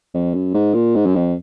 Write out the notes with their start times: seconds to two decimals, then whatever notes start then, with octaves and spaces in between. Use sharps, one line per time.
0.14 F2
0.34 F#2
0.54 G#2
0.74 A#2
0.95 G#2
1.06 F#2
1.15 F2